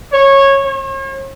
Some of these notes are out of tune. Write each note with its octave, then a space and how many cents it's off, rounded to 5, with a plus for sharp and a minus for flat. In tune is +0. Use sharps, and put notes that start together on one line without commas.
C#5 -15
C#5 -45